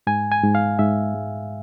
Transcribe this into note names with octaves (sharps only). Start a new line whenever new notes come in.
G#2 G#5
G#5
G#2
F5
G#2 E5
G#3